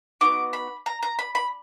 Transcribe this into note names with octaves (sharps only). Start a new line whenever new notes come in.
B3 D#4 F#4 D6
B5
A#5
A#5
B5
B5